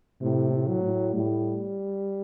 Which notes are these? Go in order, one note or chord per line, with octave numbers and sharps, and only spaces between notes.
A2 C3
A2
F#3
A2
A2 G3